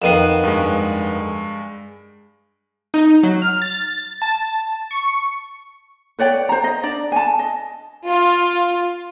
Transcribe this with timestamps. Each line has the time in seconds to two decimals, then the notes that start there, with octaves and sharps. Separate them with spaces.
0.02 F2 D#3 B3 C7 D#7 E7
0.43 G2 G#3
2.94 D#4
3.23 F#3
3.42 F6
3.62 A6
4.22 A5
4.91 C#6
6.19 B4 C#5 D5 G5
6.49 C5 A#5
6.64 D#5
6.83 D4 D5
7.12 G#5 A5
7.39 D#5
8.05 F4